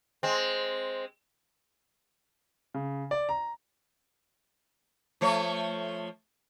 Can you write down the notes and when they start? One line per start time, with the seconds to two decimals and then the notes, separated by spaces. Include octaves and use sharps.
0.23 G#3 C4
2.74 C#3
3.11 D5
3.29 A#5
5.21 F3 A3 C#5